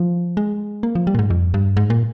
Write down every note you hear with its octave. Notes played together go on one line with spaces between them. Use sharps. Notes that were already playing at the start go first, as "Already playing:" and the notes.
Already playing: F3
G#3
A#3
F3
G3
A#2
G#2
F2
G2
G#2
A#2